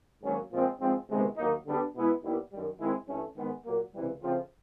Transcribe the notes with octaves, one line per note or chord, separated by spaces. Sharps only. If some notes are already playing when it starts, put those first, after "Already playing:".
G#2 D#3 F#3 A#3 C#4
A#2 F3 G#3 C4
G#2 F3 G#3 C4
D2 C3 D#3 G#3 B3
D#2 D#3 F#3 A#3 D#4
D3 G3 B3 D4 G4
B2 G#3 B3 E4
D#2 D#3 G3 B3 E4
F#2 D#3 G3
D#3 G#3 C4 E4
G2 E3 A3 C#4
G#2 D#3 G#3 B3
A#2 F#3 A#3
C#2 C3 E3 G3
C#3 F3 A3 C4 F4